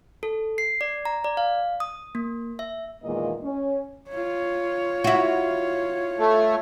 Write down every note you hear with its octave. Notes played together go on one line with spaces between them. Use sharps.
A4
C7
D5
A#5
D5
F5
D#6
A#3
E5
E2 A#2 D#3 G#3 A#3 D#5
C#4
F4 C#5
E4 F#4
A3